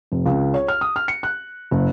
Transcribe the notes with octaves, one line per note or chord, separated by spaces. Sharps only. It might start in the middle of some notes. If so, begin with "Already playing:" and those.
F1
C#2
C#5
F6
D#6
F6
C#7
F#6
F#1